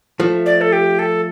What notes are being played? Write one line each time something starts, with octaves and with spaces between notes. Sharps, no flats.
F3 A3
D5
A4
G4
A4